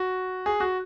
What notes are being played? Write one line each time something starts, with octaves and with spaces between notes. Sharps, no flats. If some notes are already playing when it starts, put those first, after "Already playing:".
Already playing: F#4
G#4
F#4